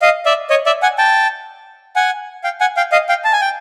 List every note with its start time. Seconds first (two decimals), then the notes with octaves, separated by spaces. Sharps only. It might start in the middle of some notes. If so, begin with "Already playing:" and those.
0.02 D#5 F5
0.26 D5 E5
0.50 C#5 D#5
0.66 D5 E5
0.82 F#5 G#5
0.98 G5 A5
1.96 F#5 G#5
2.44 F5 G5
2.61 F#5 G#5
2.77 F5 G5
2.92 D#5 F5
3.09 F5 G5
3.24 A5
3.33 G#5
3.41 G5